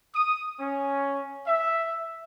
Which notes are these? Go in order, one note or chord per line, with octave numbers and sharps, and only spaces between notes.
D#6
C#4
E5